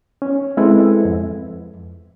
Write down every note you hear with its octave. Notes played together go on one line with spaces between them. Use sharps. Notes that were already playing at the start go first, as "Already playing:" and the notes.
C#4
G#3 C4 E4 A4 B4
F2